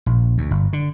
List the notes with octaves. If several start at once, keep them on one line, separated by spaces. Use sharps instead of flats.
A#1
D2
G1
D3